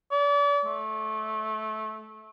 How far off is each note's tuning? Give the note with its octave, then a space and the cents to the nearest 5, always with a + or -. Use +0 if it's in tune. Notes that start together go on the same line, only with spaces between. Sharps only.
D5 -40
A3 -20